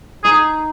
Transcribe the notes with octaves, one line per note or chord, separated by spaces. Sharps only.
D#4 G#4